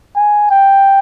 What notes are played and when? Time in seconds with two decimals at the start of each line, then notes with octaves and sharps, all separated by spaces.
0.16 G#5
0.51 G5